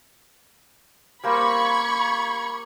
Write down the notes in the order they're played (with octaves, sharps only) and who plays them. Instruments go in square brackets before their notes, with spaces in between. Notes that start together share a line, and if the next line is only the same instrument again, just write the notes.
[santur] G3 A#3 C5 [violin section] B5 C#6 G#6